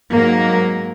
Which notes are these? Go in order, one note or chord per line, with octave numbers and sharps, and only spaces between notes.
G#2 F#3 A#3